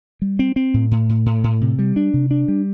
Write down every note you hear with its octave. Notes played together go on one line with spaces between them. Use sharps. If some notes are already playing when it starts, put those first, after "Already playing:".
G3
C4
C4
A2
A2
A2
A2
A2
C3
G3
D4
C3
D4
G3